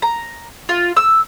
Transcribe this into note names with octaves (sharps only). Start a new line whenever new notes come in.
A#5
F4
E6